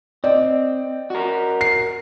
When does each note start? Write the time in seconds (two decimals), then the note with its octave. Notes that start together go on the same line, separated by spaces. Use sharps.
0.24 C4 D5 D#5
1.10 F#4 A#4
1.61 C7